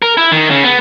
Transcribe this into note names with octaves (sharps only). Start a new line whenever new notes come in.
A#4
E4
D#3
C#3
B3